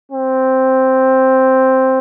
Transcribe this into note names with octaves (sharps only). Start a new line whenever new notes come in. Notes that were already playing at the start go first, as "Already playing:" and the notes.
C4